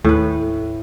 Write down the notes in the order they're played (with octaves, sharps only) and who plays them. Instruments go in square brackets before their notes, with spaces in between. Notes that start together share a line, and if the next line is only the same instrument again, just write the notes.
[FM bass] D#2 [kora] A2 B4